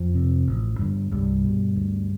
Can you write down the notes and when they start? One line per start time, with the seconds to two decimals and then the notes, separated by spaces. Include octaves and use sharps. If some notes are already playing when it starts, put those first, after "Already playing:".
Already playing: F2 F3
0.15 C3
0.47 A1
0.79 G2 D3
1.11 C2 G2 G3
1.44 B2
1.76 D2